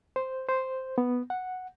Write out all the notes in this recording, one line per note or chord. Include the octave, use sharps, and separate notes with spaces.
C5
C5
B3
F#5